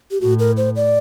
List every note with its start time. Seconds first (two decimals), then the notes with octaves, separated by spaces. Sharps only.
0.11 G4
0.21 A2 F#4
0.39 A#4
0.57 C5
0.76 D5